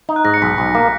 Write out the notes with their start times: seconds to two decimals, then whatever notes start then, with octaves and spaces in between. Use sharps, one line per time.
0.09 D#4
0.16 F#6
0.25 G#2 A#6
0.34 C#7
0.42 B1 B6
0.58 B1
0.75 A#3